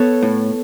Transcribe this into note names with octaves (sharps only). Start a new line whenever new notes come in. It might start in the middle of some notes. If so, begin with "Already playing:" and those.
Already playing: B3 A4 C#5
A2